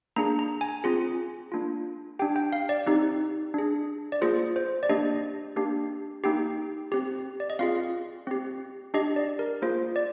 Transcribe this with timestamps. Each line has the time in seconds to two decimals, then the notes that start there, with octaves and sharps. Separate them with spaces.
0.16 A#3 D4 G#4 A#5
0.39 A#5
0.61 G#5
0.84 C4 F4 G#4
1.52 A#3 D4 F4
2.19 D4 G4 G5
2.36 G5
2.53 F5
2.69 D5
2.86 C4 D#4 G4
3.54 D4 G#4
4.12 D5
4.21 A#3 F4 G#4 C5
4.56 C5
4.83 D5
4.89 A#3 D4 G4 D#5
5.56 A#3 D4 G4
6.24 A#3 D#4 G4 G5
6.92 C4 G4
7.40 D5
7.50 D#5
7.59 C4 F4 G#4 F5
8.27 C4 G4
8.94 D4 G4 D#5
9.16 D5
9.39 A#4
9.62 A#3 F4 G#4 C5
9.96 D5